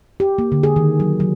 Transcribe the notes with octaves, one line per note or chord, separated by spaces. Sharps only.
G4
A#3
D3
G#4
D#3
F#3
F#3